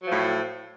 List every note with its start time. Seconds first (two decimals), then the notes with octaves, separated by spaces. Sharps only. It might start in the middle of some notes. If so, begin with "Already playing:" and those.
0.02 F#3
0.06 F3
0.11 A2